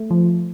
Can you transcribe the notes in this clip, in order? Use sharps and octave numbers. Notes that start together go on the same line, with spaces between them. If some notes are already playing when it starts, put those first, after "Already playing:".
Already playing: A3
F3